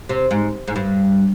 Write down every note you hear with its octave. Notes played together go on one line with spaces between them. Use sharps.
C3
G#2
G#2
G2